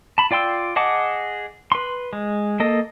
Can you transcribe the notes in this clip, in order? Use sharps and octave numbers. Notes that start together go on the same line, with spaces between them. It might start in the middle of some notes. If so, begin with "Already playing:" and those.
A5 B5
F4 D5 G5 C6 E6
G#4 D#5 F#5 A5 D6
B4 C6
G#3
A#3 A4 D#5